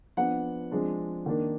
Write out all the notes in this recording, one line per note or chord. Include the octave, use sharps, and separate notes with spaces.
F3 B3 D4 F#5
F3 G#3 D4
D#3 A#3 D4